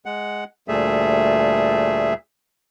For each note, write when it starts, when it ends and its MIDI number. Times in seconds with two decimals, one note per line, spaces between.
0.06 0.44 56
0.06 0.44 78
0.68 2.14 38
0.68 2.14 46
0.68 2.14 55
0.68 2.14 57
0.68 2.14 68
0.68 2.14 76